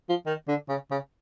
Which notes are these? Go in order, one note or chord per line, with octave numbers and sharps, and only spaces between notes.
F3
D#3
D3
C#3
C#3